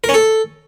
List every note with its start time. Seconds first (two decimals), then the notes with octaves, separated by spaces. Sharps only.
0.04 A#4
0.09 C#4
0.14 A4